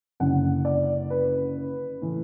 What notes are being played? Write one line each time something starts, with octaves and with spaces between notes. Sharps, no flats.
F#1 F#2 D3 F#5
D5
B4
A2 E3